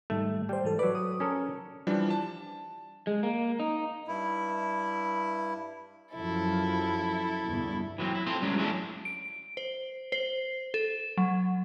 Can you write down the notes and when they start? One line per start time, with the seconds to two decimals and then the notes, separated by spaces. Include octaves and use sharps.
0.10 G#2 D#3 G3 A3
0.49 G3 C5 G5
0.64 G#2 E3 A4
0.79 F#3 B4 D5
0.95 D#6
1.20 C#4 A4 A#4
1.87 E3 F3 G3 D4
2.10 A5
3.07 G#3
3.23 A#3
3.60 D#4
4.08 G2 E4
6.14 F#2 F3 E4 A4
7.46 G1 E2 G2
7.98 E3 F#3 A#3 C4
8.15 E4
8.26 A3 C4 F4 C5
8.41 C#2 G2 C#3 F#3 C#4 D4
8.57 E3 F#3 G#3 A3 C#4 D4
9.05 D7
9.57 C5
10.12 C5
10.74 A4
11.17 F#3